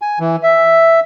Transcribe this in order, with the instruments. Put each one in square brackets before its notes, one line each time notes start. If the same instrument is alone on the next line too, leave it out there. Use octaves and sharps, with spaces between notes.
[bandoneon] G#5
E3
E5